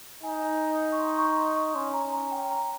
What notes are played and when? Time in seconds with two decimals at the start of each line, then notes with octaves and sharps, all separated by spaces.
0.23 D#4 G#5
0.92 C#6
0.99 C6
1.14 C6
1.18 C#6
1.37 C6
1.56 C#6
1.75 C#4 C6
1.93 A#5
2.13 A#5
2.32 G5
2.51 A#5